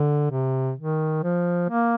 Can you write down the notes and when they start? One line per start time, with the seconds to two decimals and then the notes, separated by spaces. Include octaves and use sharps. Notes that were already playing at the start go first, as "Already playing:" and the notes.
Already playing: D3
0.31 C3
0.77 D#3
1.23 F3
1.69 A#3